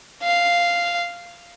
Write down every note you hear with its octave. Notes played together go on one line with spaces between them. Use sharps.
F5